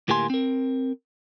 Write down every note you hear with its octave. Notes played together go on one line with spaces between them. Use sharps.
D2 A2 A#3 G4 G#5 C6
C4 A#4